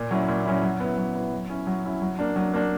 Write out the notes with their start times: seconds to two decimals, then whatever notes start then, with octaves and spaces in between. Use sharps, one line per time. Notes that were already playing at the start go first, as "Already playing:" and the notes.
Already playing: A#2
0.11 F#3 C#4 E4
0.28 A#2
0.45 F#3 C#4 E4
0.63 F#3
0.80 B3 E4
0.98 F#3
1.15 B3 E4
1.32 F#3
1.49 C#4 E4
1.67 F#3
1.84 C#4 E4
2.02 F#3
2.19 A#3 D4
2.36 F#3
2.53 A#3 D4